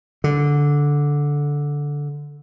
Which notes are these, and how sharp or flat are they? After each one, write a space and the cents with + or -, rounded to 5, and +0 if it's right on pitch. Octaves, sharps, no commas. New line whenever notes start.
D3 -10